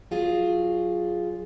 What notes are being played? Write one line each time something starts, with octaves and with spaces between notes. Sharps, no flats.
F#3 F4 G#4